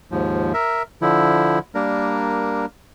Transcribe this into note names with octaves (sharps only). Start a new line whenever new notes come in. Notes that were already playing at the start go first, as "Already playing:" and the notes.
D#2 G#2 F3
A#4 E5
D3 F3 E4
G3 A#3 D4 A#4